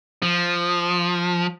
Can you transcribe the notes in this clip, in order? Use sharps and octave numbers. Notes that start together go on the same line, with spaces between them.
F3